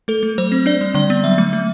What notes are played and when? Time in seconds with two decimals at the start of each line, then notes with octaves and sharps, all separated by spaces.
0.08 A3 A4
0.23 A3
0.38 F#3 C5
0.52 C4
0.66 D4 D5
0.81 G3
0.94 D3 D5
1.10 B3
1.24 F#3 E5
1.38 A3
1.53 A3